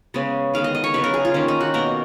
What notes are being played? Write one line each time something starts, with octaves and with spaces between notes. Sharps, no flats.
C#3 G#3 B3
D#3 G#3 B3 F5
D#5
D#5
C#5
C#3 F#3 B3 B4
A#4
G#4
F4
D#3 A#3 C#4
D#4
F#4
B2 A#3 A#4